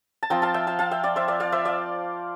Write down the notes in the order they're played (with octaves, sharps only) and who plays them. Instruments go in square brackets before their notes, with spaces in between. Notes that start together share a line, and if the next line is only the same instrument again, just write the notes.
[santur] A5
F3 C4 F4 G5 A#5
F5 A5
E5 G5
F5 A5
F5 A5
E5 G5
D5 F5
C5 E5
D5 F5
D5 F5
C5 E5
D5 F5